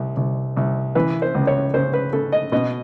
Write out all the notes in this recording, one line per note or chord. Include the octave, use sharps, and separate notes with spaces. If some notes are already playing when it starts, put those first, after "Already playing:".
Already playing: C2
C2
C2
E3 B4
C5
C#2
C#5
C#3 C5
B4
C#3 A4
D#5
B2 D#5